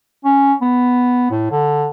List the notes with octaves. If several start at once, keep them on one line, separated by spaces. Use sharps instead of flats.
C#4
B3
A2
D3